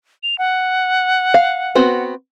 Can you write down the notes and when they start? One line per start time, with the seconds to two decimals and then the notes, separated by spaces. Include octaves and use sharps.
0.23 F7
0.38 F#5
1.34 F5
1.75 B3 C4 F#4